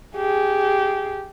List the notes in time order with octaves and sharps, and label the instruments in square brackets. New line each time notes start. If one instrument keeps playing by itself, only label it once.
[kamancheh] G4 G#4